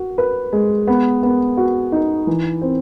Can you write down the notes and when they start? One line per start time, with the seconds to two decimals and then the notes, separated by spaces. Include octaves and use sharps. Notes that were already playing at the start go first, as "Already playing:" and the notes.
Already playing: F#4
0.18 B4
0.53 G#3
0.87 B3
1.23 B3
1.57 F#4
1.92 D#4
2.27 E3
2.62 C4